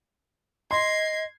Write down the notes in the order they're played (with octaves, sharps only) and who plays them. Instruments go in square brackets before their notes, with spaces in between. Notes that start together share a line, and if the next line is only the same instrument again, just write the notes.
[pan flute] D#5 [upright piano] C6 [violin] G#6 C7